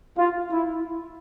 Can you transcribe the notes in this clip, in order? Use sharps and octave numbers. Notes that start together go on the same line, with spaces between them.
F4
E4